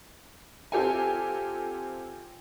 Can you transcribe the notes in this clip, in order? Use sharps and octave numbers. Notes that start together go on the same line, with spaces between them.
C4 F4 G4 A4 G#5